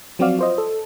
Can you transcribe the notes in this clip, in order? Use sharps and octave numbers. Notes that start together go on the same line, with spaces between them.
F3 F#3 C4 F#4 D5 F5
F4 C5 D#5
A4